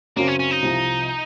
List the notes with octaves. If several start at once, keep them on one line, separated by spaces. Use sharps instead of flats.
F#2 C#3 F#3 A#3 C4
C#4
C#4
D#4
C2 C3 F3